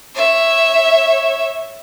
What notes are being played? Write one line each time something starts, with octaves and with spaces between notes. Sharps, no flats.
C#5 E5